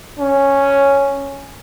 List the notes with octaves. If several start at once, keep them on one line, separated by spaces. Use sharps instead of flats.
C#4